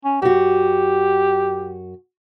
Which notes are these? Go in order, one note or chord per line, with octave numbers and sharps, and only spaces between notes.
C#4
F#2 F#4 G4